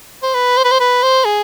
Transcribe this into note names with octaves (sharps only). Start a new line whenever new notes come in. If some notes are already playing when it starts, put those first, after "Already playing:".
C5
B4
C5
B4
C5
B4
C5
G#4